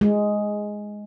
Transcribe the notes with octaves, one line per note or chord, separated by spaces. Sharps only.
G#3